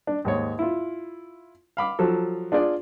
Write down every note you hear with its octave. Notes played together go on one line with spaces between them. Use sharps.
D4
D#2 G#2 C#5
E4 F4
F5 B5 D6
F3 F#3 A4
D4 F4 G#4 D5